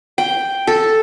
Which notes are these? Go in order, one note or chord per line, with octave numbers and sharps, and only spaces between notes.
G5
A4